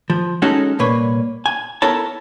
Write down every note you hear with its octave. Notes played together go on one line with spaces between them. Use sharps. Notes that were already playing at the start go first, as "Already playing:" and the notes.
F3
G#3 C#4 D#4 F#4 G#4 A4
C2 A#2 A#3 B4 C#5
G#5
B3 E4 A4 A#4 C#5 A5